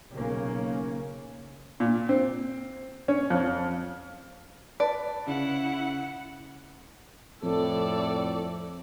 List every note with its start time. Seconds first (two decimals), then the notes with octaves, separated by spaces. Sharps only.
0.14 B1 C#3 A#3 C#4
1.80 A#2
2.09 C4
3.08 C#4
3.30 F2
4.80 B4 D5 A5
5.27 C#3 E4 F#5
7.43 F2 A2 A4 D5